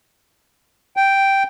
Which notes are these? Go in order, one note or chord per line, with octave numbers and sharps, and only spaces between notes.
G5